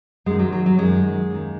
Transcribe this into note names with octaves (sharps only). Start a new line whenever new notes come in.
F#2 D#3 G#3
F#3
F#3
F#3
F#2 D#3 G#3
D#2 D#3